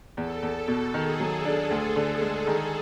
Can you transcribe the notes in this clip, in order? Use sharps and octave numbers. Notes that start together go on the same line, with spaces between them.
E2 A4
E2
A4
B2
D#3 G#4
F#3
G#4
D4
D2
D3
G#3
D#3